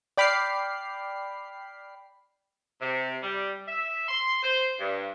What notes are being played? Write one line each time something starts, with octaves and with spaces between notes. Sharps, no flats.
D5 G5 B5 D6 F6 C7
C3
G3
E5
C6
C5
G2